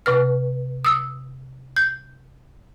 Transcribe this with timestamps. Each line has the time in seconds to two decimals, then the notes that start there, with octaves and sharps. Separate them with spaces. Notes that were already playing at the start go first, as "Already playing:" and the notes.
0.06 C3 B4 F6
0.85 D#6 E6
1.76 G6